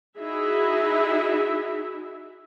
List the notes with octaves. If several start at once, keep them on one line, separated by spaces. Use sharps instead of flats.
D#4 E4 F#4 G#4 E5